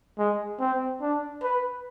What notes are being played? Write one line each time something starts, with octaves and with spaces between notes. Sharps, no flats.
G#3
C4
D4
B4